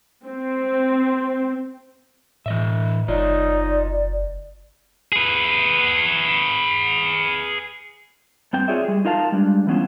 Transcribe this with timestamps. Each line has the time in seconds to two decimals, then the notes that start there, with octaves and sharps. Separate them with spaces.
0.25 C4
2.46 A2 E3 D#5 E5
3.08 F#1 D#4 F4 C#5 D5
5.12 G#4 B4
8.53 G2 C4 G5
8.68 F4 G#4 C#5 D5 E5
8.84 G3 G#4
9.05 D#4 F4 A#4 F5 A5
9.32 G3 G#3 D4
9.67 E3 G3 B3 C#4 E4 F4